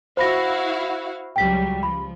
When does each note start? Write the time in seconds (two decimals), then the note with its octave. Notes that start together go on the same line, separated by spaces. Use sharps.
0.17 E4 F#4 C5 F5 B5 A#6
1.36 C#2 F#3 G3 G5 B6
1.83 F3 B5